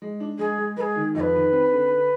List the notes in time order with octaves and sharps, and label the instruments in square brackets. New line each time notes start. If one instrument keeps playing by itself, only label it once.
[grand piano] G#3
D4
[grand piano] G#3 [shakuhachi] G#4
[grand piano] G#3
[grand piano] G#3 [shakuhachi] G#4 B4
[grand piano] D#3
[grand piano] F2 [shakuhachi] D#5
[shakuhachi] B4
[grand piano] D#3
C4
D3
D3